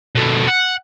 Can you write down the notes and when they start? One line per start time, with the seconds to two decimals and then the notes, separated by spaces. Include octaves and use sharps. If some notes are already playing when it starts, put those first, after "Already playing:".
0.15 B2 A3
0.47 F#5